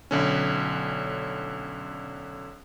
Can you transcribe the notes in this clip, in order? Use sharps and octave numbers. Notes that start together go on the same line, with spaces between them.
B1 D3 C#4